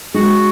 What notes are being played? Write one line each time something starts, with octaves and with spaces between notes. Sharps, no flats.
G#3 F#4